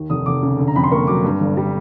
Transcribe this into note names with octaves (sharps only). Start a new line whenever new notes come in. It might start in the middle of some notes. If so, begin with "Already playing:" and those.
Already playing: D#2
F1 D#6
F1 D6
C#3
D3
A#5
F2 B5
C6
A#3 C#6
F#3 D6
G2
G1
G3